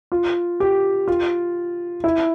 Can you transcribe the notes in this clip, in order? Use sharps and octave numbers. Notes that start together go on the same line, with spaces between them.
F4
G4
F4
E4